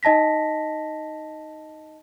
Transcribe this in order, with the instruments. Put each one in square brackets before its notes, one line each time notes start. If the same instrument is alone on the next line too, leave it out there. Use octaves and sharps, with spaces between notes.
[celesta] D#4 D#5 A5 A#6 B6